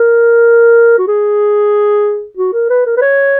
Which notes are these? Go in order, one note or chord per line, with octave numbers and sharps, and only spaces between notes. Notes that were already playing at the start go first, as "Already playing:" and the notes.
Already playing: A#4
F#4
G#4
F#4
A#4
B4
A#4
B4
C#5